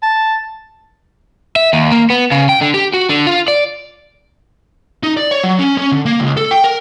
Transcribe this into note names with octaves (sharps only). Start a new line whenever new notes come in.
A5
E5
D#2
A#3
B3
C#3
G5
D3
G4
F#4
D3
F4
D5
D#4
D5
C#5
F#3
C#4
C#4
D3
A#3
C#2
A4
G5
A#4